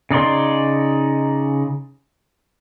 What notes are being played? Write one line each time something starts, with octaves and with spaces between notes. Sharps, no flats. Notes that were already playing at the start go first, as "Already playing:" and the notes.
C#3 D#4 D5 C6